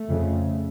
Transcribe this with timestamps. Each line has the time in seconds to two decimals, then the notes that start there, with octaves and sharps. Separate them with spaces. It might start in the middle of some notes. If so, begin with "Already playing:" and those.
Already playing: A3
0.09 F2 C#3